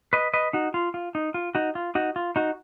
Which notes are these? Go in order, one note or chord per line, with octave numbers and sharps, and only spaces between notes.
B4 D#5
B4 D#5
D#4 F#4
F4
F4
D#4
F4
D#4 F#4
F4
D#4 F#4
F4
D#4 F#4